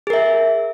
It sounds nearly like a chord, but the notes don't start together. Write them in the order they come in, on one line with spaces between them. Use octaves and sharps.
G#4 A#4 E5